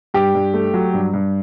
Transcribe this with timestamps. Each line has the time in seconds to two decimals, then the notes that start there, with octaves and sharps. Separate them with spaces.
0.14 G2 G4
0.35 G2
0.54 A3
0.74 F#3
0.94 G2
1.13 G2